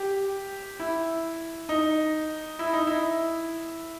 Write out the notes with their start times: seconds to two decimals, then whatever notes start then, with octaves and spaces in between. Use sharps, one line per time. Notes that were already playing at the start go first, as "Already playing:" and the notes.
Already playing: G4
0.80 E4
1.69 D#4
2.59 E4
2.73 D#4
2.87 E4